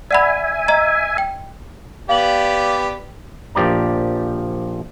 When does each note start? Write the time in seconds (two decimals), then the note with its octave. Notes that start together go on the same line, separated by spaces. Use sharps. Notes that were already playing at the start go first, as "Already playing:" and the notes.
0.11 D5 E5 F#5 G#5 B5
0.68 D#5 A#5
1.18 G5
2.09 B3 G4 D5 F5 F#7
3.55 A#1 F3 G4 D5 A#5